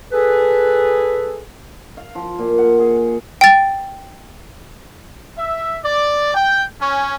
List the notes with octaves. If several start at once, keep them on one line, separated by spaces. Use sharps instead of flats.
G#4 A4 B4
F5
F3
A#2
F#5
G#4
G5 A6
E5
D5
G5
C#4